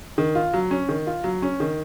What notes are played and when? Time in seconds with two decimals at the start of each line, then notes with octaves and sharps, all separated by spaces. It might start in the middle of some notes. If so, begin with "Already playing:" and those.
0.18 D#3
0.35 F4
0.53 F#3
0.71 C#4
0.89 D#3
1.07 F4
1.24 F#3
1.42 C#4
1.60 D#3